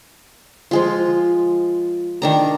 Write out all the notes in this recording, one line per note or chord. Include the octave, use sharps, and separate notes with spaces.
F3 G#3 F4
D#3 D4 A#5